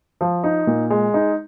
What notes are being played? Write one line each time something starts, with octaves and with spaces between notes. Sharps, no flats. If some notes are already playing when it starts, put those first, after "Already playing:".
F3
D#4
A#2
G#3
D#4